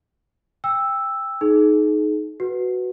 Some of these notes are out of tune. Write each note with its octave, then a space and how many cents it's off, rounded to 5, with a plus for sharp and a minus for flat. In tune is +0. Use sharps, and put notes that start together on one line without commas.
G5 +20 E6 +0
D#4 +0 G#4 +35
F#4 +0 B4 +0